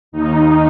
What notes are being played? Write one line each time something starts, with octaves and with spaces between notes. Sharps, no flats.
D#2 D#3 D#4